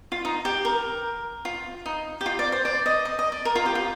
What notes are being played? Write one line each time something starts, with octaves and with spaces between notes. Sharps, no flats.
F4
D#4
G4
A#4
F4
D#4
G4
F4
D5
C5
D5
D#5
D#5
D#5
D5
A#4
F4
G4
F4